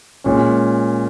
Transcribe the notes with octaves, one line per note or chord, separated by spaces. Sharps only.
A#2 G#3 C#4